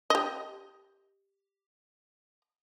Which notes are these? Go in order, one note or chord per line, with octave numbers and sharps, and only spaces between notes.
G4 D#5